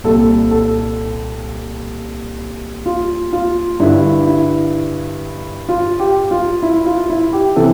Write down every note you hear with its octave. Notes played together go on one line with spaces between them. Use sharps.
C2 A#2 A4
A4
F4
F4
G2 D3 E4
E4
F4
G4
F4
E4
F4
E4
G4
C3 E3 A4